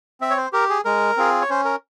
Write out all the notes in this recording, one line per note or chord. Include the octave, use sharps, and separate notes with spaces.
C4 E5
C#5
C5
G4 A#4
G#4
G#3 A#4
C4 F4 G#4
C#5
C#4 C5
A#4